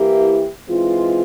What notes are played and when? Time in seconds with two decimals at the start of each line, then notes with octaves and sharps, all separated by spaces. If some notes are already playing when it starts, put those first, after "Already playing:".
Already playing: E3 A#3 E4 G4
0.67 E3 G#3 C4 F4